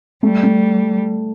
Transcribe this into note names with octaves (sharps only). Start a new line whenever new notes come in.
G3 A3
A3